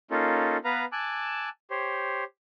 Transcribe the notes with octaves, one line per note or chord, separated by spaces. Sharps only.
A#3 C#4 D#4 F4 A4
B3 B4 F5 A#5
G#5 A5 D6 E6 F#6
G4 C5 C#5